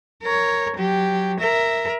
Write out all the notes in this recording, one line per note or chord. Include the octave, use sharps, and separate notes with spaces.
A#4 C#5
F#3 G4
A#4 E5